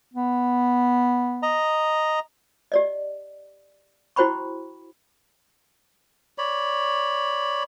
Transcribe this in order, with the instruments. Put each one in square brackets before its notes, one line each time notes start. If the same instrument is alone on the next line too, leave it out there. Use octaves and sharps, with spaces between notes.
[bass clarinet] B3
[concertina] D#5 A#5
[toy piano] G4 D5 D#5
E4 F#4 C5 G5 B5 C#6
[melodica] C#5 D5 B5